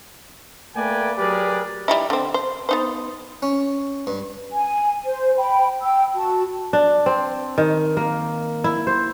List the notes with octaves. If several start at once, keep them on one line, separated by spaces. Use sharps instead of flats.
A3 A#3 B4 D5 G5 G#5
F#3 G4 G#4 A#4 B4 D5
G3 D#4 E4
D3 C4
C5
B3 D#4 C5
C#4
G2
G#5
C5
G5 B5
G5 E6
F#4 A5
D4
C4
D#3
A#3
E4
C5